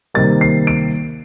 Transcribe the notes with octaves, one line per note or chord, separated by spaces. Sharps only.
C3 D#3 G3 A#3 A6
C7
D7